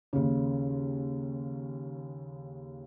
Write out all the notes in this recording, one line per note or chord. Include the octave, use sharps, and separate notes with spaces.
D#2 C#3